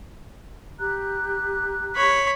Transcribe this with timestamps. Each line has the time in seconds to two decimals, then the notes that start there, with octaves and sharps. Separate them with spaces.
0.79 G4 A#5 F#6
1.96 C#5 B5